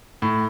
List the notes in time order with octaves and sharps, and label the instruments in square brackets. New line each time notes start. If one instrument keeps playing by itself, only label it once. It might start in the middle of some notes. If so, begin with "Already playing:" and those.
[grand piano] A2